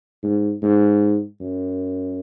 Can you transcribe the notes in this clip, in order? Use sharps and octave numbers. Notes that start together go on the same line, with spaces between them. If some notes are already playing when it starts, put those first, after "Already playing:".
G#2
G#2
F#2